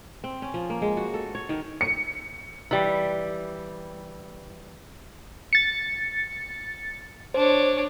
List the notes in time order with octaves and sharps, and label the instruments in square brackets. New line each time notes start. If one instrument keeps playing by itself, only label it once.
[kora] C4
C#4
F3
A#3
G#3
F#4
A4
C#5
D#3
[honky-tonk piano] C#7
[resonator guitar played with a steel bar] E3 G3
[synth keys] A6 C#7
[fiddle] D4 C#5 [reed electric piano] C5